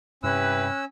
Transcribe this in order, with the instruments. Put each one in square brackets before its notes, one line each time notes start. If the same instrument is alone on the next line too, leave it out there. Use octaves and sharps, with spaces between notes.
[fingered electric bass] G2 C3 [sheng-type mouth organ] C#4 E6 [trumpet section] E4 G4 B4 [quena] F#6